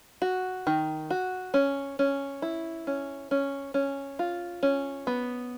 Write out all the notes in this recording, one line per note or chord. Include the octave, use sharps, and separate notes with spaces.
F#4
D#3
F#4
C#4
C#4
E4
C#4
C#4
C#4
F4
C#4
B3